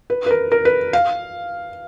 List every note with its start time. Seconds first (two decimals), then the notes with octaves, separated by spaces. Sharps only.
0.10 B4
0.26 B4
0.31 A#4
0.52 A#4
0.65 B4
0.93 F5